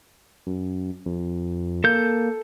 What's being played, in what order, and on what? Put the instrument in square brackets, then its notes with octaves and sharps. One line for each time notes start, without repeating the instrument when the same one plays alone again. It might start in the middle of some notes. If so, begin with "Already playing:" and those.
[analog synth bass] F#2
F2
[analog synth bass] A#3 [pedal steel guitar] A4 G6